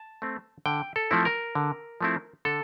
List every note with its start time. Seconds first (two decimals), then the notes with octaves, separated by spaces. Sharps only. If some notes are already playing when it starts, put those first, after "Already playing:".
Already playing: A5
0.22 A3 C4
0.66 D3 G5
0.96 A4
1.11 F3 A3 C4 E4
1.25 A#4
1.55 D3
2.01 F3 A3 C4 E4
2.45 D3 A4